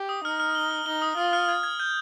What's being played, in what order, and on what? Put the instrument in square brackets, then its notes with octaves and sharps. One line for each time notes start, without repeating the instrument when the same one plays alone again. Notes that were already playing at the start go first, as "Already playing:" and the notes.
Already playing: [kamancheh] G4
[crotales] D#6
[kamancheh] D#4 [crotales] F6
[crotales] F6
G7
F6
[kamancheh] D#4 [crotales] G7
[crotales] D#6
[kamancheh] F4 [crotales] F6
[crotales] F6
G#6
G#6
G6